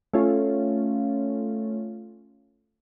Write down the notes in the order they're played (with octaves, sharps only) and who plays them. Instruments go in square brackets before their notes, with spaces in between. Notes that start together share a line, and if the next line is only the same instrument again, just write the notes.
[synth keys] A3 C#4 F4